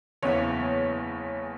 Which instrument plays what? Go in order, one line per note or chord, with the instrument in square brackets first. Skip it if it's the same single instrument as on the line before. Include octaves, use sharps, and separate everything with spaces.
[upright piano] F#1 E2 C#3 E3 C#5